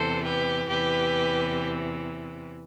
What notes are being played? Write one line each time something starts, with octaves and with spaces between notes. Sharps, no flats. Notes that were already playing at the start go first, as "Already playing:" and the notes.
Already playing: E2 C3 E3 A4 C5
G4 B4
E2 C3 E3 G4 B4